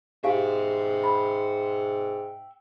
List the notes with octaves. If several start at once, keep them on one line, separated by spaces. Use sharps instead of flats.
G#2 G4 E5 F5 G5 G#5
B5